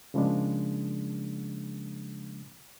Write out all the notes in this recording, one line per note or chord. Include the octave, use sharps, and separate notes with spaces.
C#3 F3 G#3 A#3 D4